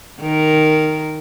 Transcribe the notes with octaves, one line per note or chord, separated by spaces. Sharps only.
D#3 A#4